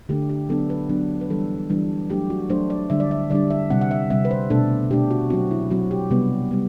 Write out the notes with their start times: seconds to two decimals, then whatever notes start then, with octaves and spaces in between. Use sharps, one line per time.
0.09 D3 A3 D4 G4
0.29 G4
0.49 F#3 B3 D4 A4
0.70 B4
0.89 F#3 B3 D4
1.21 B4
1.30 E3 G3 D4 A4
1.70 E3 G3 D4
2.10 F#3 A3 D4 G4
2.30 F#4
2.49 F#3 A3 D4 C5
2.70 D5
2.90 D3 G3 D4 E5
3.00 D5
3.11 E5
3.30 D3 G3 D4 D5
3.51 E5
3.70 C3 G3 C4 F#5
3.81 F#5
3.91 E5
4.10 C3 G3 C4 E5
4.25 B4
4.31 C5
4.50 B2 A3 D4 A4
4.91 B2 A3 D4 G4
5.11 F#4
5.30 F#3 C4 F#4
5.51 E4
5.71 F#3 C4 F#4
5.91 G4
6.11 C3 G3 B3
6.51 G3 B3